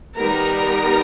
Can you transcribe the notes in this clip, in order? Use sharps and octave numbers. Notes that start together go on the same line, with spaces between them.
D#3 G3 B3 A#4 A#5